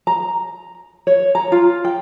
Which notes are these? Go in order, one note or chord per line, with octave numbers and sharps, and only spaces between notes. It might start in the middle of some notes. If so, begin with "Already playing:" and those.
A#5
C#5
A#5
F4
G5